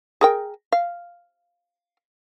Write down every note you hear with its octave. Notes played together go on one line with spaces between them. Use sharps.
G#4 A#4 G5
F5